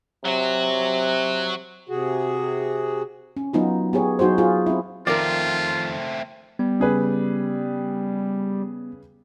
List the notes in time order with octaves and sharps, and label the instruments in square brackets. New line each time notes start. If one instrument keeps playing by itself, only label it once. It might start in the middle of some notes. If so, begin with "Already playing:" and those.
[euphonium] C3 [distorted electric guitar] F#3 F#4
[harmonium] C3 F#4 G#4
[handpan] C#4
F#3 B3 D#4 F4
B3 G4 G#4 C#5
F#3 D#4 F#4 G#4 C5
F4 G#4
C4 E4
[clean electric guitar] F2 D#3 [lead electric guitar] A3 C4 [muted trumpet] F4 [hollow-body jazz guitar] A#4 D5
[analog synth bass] G3 [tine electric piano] B3
[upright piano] C#3 G#4 B4